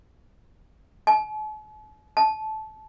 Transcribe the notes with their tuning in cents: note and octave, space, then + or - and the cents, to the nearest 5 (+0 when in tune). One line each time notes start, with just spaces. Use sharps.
A5 -45
A5 -20